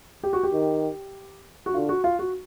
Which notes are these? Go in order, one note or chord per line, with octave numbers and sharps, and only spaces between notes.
G4
F#4
G4
D#3
F#4
D3 F4
F#4
F4
F#4